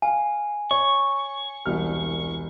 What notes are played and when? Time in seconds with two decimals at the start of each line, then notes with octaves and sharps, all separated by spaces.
0.02 F5 G#5
0.71 C#5 C#6
1.66 E1 C2 F6